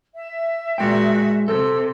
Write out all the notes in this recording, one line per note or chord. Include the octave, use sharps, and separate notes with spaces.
E5
A#2 G#3 F#4 G5
C3 A4 E6